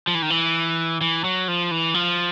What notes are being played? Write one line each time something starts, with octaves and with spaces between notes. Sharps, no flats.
F3
E3
D#3
E3
E3
F#3
F3
E3
F3